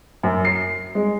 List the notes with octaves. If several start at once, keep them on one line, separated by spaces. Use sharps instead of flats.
F#2
C7
G#3